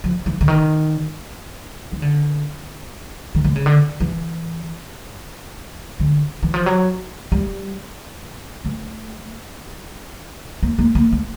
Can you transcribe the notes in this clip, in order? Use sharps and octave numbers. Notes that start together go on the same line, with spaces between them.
F3
E3
D3
D#3
D#3
D3
D#3
D3
C#3
D3
E3
D3
E3
F3
F#3
G3
A3
A#3
A#3
A#3
A3